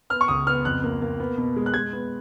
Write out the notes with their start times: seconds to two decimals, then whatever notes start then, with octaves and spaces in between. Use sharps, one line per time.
0.10 B3 F6
0.21 C#6
0.28 C#2 D#6
0.47 B3 F6
0.65 F2 F#6
0.84 A#3
1.02 A#3
1.20 B3
1.38 B2
1.56 G#3
1.66 F#6
1.74 G#3 G#6
1.93 B3